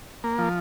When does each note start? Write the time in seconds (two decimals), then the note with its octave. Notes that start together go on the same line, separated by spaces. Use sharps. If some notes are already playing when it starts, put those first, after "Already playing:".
0.24 A#3
0.39 F3